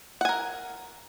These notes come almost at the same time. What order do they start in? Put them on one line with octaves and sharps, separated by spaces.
F#5 G#5 A#4